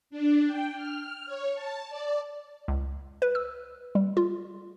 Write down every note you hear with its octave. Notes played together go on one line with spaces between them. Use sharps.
D4
G5
F6
C#5
A5
D5
C#2
B4
E6
G3
F4